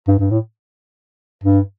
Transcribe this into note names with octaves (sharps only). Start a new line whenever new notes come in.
G2
G2
A2
G2